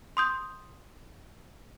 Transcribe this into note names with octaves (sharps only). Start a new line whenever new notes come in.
C6 D#6 G6